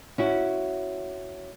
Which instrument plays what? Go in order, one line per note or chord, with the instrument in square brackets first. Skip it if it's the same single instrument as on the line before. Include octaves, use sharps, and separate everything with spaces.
[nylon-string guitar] C#4 E4 F#4